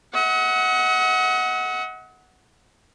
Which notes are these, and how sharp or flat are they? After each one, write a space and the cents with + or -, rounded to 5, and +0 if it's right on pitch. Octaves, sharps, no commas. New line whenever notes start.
D#5 +45 F#5 +0